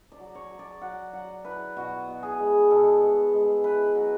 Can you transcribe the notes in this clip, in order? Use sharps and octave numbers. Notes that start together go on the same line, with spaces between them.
D5
F#3
C#5
F#3
D5
F#3 F#5
F#3 F#5
E4 B4
B2 F#4
B2
G#4
G#3
B2 A4
G#3
G#3
E4 B4
F#3